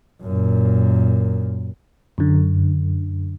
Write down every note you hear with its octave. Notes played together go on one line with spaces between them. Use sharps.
F#2 A#2
F#2 D3